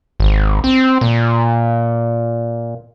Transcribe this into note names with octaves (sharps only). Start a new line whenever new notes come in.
G#1
C4
A#2